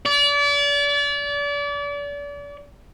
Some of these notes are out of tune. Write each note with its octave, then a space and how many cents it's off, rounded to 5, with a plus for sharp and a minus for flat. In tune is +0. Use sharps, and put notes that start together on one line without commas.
D5 -35